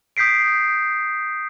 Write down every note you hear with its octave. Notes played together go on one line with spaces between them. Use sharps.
D#6 G6 B6 C7 D7